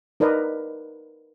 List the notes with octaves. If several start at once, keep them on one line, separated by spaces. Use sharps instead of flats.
D#4 A#4 B4 D5 D#5